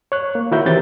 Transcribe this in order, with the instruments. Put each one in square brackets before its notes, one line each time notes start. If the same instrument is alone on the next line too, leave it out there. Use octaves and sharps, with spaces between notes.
[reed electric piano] C#5 F#6
A#3
D#3 E4 F#4 A#4 E5 G6
E3 C4 G4 G6 A6